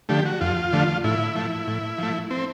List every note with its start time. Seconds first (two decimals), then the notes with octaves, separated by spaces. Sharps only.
0.09 D3 F3 A3 G4
0.25 F#4
0.41 F2 F4
0.73 D3 F3 A3
1.04 A2 E4
1.35 F3 A3
1.67 A2
1.98 F3 A3
2.31 C4